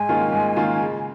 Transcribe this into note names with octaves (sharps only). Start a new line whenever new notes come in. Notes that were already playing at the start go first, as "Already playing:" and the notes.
Already playing: G#2 G#5
D#3 A#3 C#4 F4
G#2
D#3 A#3 C#4 F4
C#3